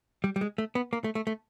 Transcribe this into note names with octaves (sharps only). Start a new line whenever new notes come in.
G3
G3
G#3
A3
B3
A#3
A3
A3
A3